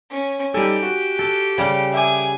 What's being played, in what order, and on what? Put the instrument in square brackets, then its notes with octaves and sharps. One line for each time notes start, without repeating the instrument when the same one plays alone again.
[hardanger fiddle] C#4
[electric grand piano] G3 D#4 A4 [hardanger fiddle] G4 [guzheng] G#5
[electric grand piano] F#4
[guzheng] A4
C#3 G3
[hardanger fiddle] G#4 G#5 [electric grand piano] E5 G5 D6